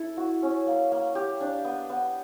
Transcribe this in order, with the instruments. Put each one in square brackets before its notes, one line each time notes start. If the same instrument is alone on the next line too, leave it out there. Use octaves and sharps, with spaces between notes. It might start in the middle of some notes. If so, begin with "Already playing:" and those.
Already playing: [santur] E4 A4
F#4
C#4
A#3
A#3
G4
D4
B3
B3